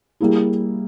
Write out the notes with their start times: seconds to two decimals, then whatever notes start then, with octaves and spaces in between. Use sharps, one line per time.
0.21 G3 A#3 E4 G#4